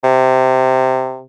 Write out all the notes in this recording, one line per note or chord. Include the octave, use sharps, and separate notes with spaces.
C3